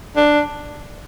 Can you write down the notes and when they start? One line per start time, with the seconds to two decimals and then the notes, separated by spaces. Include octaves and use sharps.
0.16 D4